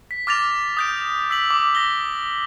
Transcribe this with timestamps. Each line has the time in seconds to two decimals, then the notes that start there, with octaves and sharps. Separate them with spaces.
0.11 B6
0.27 D6 F6 A6 A#6 F7
0.77 D#6 G6 D7
1.30 E6 B6 F#7
1.51 D6
1.75 A#6 G7